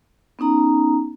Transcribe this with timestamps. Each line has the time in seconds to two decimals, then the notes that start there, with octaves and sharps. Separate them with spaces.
0.39 B3 C#4 D#4 A#5